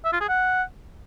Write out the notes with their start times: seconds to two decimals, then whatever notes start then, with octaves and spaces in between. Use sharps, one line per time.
0.05 E5
0.13 F4
0.21 G#4
0.29 F#5